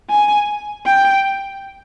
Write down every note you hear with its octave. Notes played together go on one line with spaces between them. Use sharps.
G#5
G5